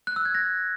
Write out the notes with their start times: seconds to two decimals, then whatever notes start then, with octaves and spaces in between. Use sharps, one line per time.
0.07 F#6
0.16 E6
0.25 G#6
0.35 A#6